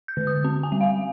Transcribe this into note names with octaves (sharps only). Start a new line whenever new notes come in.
G6
D3
D#6
C4
G#5
G3
F5